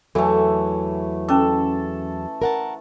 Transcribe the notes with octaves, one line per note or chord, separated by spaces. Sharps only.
E2 E3 F#3 A3 A4
C#4 A4 D6
A#4 F#5 A5